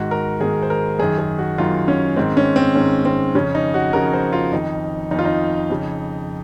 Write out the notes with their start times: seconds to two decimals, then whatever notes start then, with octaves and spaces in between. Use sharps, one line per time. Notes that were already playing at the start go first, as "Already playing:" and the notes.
Already playing: G#2 D#3 F#4
0.11 A#4
0.40 G#2 D#3 G#4
0.63 C5
0.70 A#4
0.99 F#2 D#3 G#4
1.18 G#4
1.38 F#4
1.58 F#2 D#3 F4
1.88 C#4
2.16 G#2 D#3 C4
2.37 C#4
2.56 C4
2.75 G#2 D#3 C#4
3.05 C4
3.35 F2 C#3 C#4
3.55 D#4
3.74 F#4
3.93 F2 C#3 A#4
4.14 C5
4.33 F4
4.52 F2 D#3 D#4
5.11 D#3 D#4
5.14 F2 F4
5.25 D#4
5.70 F2 C#3